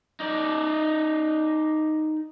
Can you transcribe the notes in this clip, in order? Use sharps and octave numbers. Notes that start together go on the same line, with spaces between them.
D#4 D5